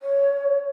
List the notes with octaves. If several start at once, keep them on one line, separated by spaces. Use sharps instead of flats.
C#5